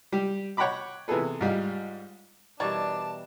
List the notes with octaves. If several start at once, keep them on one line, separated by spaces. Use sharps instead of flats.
G3 G4
C#5 F#5 G5 A#5 B5 D6
C3 E3 B3 G#4 A4 B4
G#2 G3 F4
B2 E3 G3 D4 A#4 C#5 D5 A5